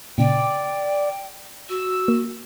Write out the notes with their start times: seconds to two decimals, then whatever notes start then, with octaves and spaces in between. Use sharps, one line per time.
0.18 A#2 C#3 D5 G5
1.69 F#4 E6
2.08 A#3